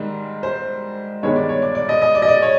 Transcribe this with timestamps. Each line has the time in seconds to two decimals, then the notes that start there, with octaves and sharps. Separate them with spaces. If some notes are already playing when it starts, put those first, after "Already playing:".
Already playing: G#2 D#3 G3
0.43 C5
1.23 G2 D#3 G#3 B3 C#5
1.36 D5
1.49 C#5
1.62 D5
1.75 D5
1.89 D#5
2.02 D#5
2.15 D5
2.22 D#5
2.28 D5
2.42 C#5